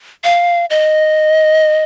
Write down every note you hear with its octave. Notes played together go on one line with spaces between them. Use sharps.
F5
D#5